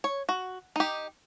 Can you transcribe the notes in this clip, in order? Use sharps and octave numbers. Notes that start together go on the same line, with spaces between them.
C#5
F#4
D#4 G4